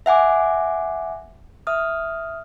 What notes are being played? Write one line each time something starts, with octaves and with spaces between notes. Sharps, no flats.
E5 F#5 G#5 D6
E5 D#6 F6